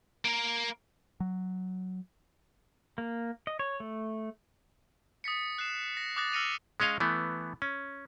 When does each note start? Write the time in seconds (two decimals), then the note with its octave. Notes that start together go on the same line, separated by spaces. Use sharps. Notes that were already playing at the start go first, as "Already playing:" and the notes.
0.25 A#3 A#4
1.20 F#3
2.98 A#3
3.47 D#5
3.59 C#5
3.80 A3
5.24 D#6 A6 B6 C#7
5.58 F#6 C7 E7
5.97 A#6
6.16 D6 D#6 F#6 A6 A#6
6.33 E6 F6 A#6 C#7 D#7 F7
6.80 G#3 C#4 C#5 D#5 F5
7.00 E3 A3 B3
7.62 C#4